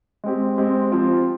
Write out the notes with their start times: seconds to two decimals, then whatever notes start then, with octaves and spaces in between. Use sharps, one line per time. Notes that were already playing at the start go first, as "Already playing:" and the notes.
0.24 G#3 C4 G4
0.58 G#3 C4 G4
0.91 F3 C4 F4